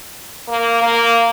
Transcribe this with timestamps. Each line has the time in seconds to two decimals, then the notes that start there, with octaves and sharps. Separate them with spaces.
0.48 A#3
0.82 A#3